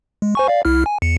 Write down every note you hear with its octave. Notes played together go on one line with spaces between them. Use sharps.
G#3
C5 G#5 C#6
D5 F5
C2 E4 F6
G#5
E2 C#7